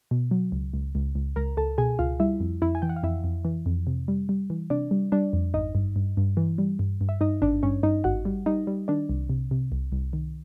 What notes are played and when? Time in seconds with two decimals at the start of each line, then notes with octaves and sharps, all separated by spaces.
0.11 B2
0.31 F#3
0.52 C#2
0.73 C#2
0.95 C#2
1.15 C#2
1.36 C#2 A#4 A#5
1.57 C#2 A4 A5
1.78 B2 G#4 G#5
1.99 C#2 F4 F5
2.20 G3 E4 E5
2.40 F2
2.62 F2 E4 E5
2.75 G#5
2.82 E3 G5
2.89 F#5
2.96 F5
3.03 F2 E4 E5
3.24 F2
3.45 E3
3.66 F2
3.87 C3
4.08 G3
4.29 G3
4.50 E3
4.70 C3 D4 D5
4.91 G3
5.12 G3 D4 D5
5.33 F2
5.54 G#1 D#4 D#5
5.75 G2
5.96 G2
6.17 G2
6.37 E3
6.58 G3
6.79 G2
7.01 G2
7.09 E5
7.21 G2 D#4 D#5
7.42 G#1 D4 D5
7.63 G2 C#4 C#5
7.83 G2 D#4 D#5
8.04 G#1 F#4 F#5
8.25 G3
8.46 G3 D#4 D#5
8.67 G3
8.88 D#3 D4 D5
9.09 C2
9.30 C3
9.51 C3
9.72 C2
9.92 C2
10.13 D#3